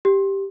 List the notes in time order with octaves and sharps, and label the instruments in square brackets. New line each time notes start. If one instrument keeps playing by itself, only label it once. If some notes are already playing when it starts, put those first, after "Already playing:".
[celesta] G4